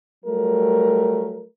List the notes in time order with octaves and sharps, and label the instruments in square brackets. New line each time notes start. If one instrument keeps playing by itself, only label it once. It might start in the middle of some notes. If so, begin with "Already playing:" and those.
[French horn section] F#3 G3 A3 A#4